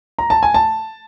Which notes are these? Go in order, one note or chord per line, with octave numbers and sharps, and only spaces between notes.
A#5
A5
G#5
A5